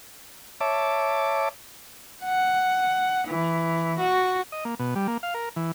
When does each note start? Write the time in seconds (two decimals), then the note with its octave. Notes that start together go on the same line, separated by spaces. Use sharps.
0.61 C#5 E5 A5 D6
2.24 F#5
3.27 E3
3.99 F#4
4.52 D#5
4.65 A#3
4.79 B2
4.95 G3
5.08 A#3
5.23 F5
5.34 A#4
5.56 E3